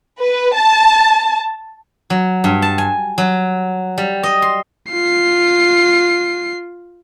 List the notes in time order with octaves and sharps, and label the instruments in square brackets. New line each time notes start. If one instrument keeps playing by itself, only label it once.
[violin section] B4
A5
[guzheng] F#3
G2
A5
G#5
F#3
G3
D#5
C6
[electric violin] F4 C7